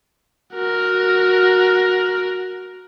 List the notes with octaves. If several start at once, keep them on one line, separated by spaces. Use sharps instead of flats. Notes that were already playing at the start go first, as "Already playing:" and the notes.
F#4 A#4